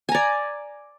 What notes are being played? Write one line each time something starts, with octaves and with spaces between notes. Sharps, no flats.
D5 G#5 A#5